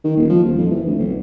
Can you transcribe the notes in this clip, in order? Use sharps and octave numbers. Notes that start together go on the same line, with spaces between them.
D#3
D#1
F3
D#1
F2
E3
D2
B1